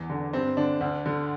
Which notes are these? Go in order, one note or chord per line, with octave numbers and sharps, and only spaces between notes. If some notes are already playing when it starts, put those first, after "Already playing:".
Already playing: E2
D3
G2 C4
D3 D4
D2
D3